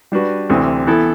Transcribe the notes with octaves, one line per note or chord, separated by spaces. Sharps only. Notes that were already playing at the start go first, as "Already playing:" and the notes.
G3 D4 F#4 B4
D2 C3 E3
E3 B3 E4 A4